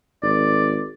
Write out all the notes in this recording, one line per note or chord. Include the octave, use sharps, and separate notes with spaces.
G#1 D5